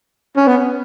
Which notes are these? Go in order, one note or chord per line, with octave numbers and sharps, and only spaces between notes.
C#4
B3